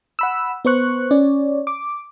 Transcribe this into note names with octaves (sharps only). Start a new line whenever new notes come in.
F#5 B5 E6
B3 B4 C5 C#6 F#6
C#4 C#5 D5
D6